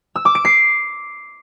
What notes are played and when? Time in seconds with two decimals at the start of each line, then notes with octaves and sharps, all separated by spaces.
0.16 E6
0.25 D6
0.35 D7
0.45 C7